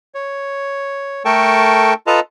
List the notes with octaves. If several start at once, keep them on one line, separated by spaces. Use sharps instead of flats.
C#5
A3 A4 A#4 G5 A5 C#6
F4 A4 B4 D#5 A5 A#5